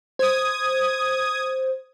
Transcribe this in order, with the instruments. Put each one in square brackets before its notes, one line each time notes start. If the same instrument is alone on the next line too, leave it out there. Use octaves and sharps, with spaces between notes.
[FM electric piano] C5 [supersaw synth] D#6 G#6